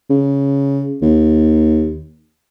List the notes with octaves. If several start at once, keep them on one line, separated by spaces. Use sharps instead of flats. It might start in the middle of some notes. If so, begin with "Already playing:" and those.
C#3
D#2